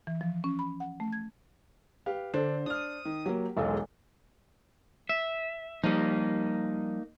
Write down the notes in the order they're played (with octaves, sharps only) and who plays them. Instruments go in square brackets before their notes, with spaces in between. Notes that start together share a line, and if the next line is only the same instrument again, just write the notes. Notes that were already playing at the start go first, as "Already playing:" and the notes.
[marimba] E3
F3
C#4
B5
F#5
A3
G#6
[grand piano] G4 B4 F5
[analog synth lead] D3 [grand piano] D4 A4 [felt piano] C5
[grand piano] D4 F6 [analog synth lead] D#6
[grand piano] D#3
[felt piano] F#3 A#3 [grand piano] G4
[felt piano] E1 B1 A4 [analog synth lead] G#3
[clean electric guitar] E5
[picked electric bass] F3 G3 [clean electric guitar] A#3 D#4